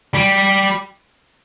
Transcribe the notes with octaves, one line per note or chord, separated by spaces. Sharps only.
G3